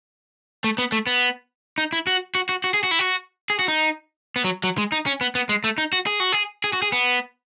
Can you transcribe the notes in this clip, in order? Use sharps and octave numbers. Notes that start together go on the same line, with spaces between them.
A3
B3
A3
B3
D#4
E4
F#4
F#4
F#4
F#4
G#4
F#4
E4
F#4
G#4
F#4
D#4
B3
F#3
F#3
G#3
D#4
C#4
B3
B3
G#3
A3
D#4
F#4
G#4
F#4
G#4
G#4
F#4
G#4
B3